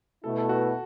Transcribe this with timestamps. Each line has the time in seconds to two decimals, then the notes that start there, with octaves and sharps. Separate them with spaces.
0.24 B2 A3 E4 A4
0.38 A4
0.49 F#4